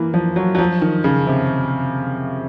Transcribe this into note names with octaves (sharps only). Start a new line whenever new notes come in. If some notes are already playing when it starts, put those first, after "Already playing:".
Already playing: E3 A#3
F3
F#3
F#3
F3
D#3
C#3
C3